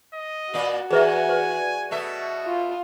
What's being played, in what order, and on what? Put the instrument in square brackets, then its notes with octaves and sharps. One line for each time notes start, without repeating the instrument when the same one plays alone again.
[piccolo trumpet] D#5
[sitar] A#2 A#3 D5 [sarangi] F#4
[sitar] E2 [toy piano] G#4 B4 E5 [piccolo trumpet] G#5
[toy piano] B4
[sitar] B2 A3 E5 [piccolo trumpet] F#4
[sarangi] F4